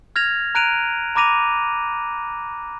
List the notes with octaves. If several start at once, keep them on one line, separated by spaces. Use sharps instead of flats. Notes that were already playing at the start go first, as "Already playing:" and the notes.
F6 G#6 A#6 F7
A#5 F#6 D7 D#7 F7
A#5 B5 D6 A#6 D#7 F7